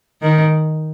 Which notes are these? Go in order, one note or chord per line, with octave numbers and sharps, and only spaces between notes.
D#3